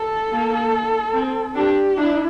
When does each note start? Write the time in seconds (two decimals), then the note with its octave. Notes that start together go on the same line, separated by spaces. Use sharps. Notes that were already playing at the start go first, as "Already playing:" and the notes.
Already playing: A4
0.31 A#3
1.13 C4
1.55 D4 G4
1.97 D4 E4